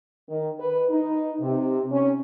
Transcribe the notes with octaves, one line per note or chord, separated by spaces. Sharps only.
D#3
B4
D#4
C3
C#4